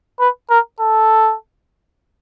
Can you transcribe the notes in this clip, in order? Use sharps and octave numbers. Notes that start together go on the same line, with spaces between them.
B4
A#4
A4